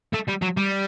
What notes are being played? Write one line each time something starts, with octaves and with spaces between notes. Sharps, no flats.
A3
G3
F#3
G3